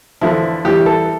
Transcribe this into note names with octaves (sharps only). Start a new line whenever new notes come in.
E2 D3 F3 E4
E2 E3 G3 G4
A4